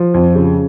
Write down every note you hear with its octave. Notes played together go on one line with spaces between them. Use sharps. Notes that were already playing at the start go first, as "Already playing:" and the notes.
Already playing: F3
F2
C#3